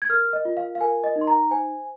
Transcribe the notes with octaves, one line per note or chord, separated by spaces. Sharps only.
G#6
A#4 F6
D#5
F4
F5
F5
A#4 G#5
D#5
D#4
C6
A#5
C5 G#5